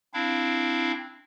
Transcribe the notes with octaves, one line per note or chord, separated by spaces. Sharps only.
C4 D4 E4 F5